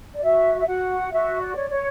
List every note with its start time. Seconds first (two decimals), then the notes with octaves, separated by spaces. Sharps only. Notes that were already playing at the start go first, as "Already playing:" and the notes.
0.16 D5
0.23 F#4 E5
0.60 E5
0.67 F#4 F#5
1.12 F#4 E5
1.41 D5
1.56 C#5
1.71 C#5